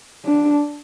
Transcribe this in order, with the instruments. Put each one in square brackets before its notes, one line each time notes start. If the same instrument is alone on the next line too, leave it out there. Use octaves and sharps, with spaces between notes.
[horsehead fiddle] D4